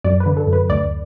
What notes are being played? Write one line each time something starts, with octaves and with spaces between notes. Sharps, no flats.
F#2 D5
B4
D3
A4
F#2
B4
D2 D5